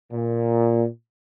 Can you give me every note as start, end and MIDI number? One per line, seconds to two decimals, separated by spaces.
0.12 0.86 46